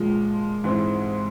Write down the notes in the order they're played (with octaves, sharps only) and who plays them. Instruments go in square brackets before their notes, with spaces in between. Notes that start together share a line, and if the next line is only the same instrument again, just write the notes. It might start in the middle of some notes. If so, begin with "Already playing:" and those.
Already playing: [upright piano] A#2 F3 G#3
G#2 E3 G#3 C4 E4